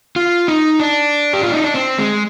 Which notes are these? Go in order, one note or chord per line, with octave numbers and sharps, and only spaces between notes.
F4
D#4
D4
G4
F4
D#4
D4
C4
G#3